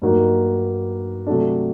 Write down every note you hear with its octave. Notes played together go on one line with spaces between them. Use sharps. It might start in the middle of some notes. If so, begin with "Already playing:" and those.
G2 F#3 A#3 D#4 F#4
C3 F#3 A3 D4